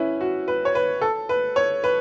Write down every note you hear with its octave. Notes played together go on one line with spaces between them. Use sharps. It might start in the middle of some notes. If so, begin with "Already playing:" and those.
Already playing: C#4 E4 B4
F#4
B4
C#5
B4
A4
B4
C#5
B4